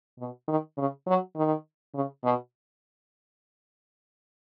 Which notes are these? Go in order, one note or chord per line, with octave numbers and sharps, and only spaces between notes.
B2
D#3
C#3
F#3
D#3
C#3
B2